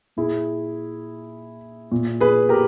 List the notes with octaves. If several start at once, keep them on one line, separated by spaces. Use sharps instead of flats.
A#2 E4 G#4
A#2
G#4 B4
G4 A#4